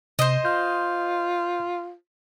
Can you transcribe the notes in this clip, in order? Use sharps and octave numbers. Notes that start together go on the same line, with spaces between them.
C3 C5 D#5
F4 G6